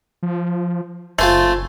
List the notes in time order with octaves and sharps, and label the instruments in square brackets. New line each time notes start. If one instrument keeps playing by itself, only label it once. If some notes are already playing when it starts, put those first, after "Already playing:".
[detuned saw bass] F3
[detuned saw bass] F#1 [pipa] A3 [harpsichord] F4 C5 G#5